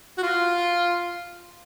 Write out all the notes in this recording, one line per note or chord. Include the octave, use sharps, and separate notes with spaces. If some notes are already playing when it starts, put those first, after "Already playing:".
F#4
F4